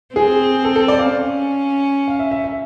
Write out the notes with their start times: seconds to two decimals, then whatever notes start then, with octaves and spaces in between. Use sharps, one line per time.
0.15 C4 G#4
0.65 A4
0.76 A4
0.88 D5
0.99 F5
1.12 C#4
2.08 F5
2.19 E5
2.31 E5
2.44 E5